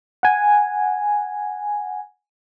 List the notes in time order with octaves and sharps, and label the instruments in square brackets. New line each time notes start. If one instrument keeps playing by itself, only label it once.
[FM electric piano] F#5 G#5